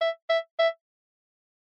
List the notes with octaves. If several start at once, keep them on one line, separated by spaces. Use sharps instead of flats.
E5
E5
E5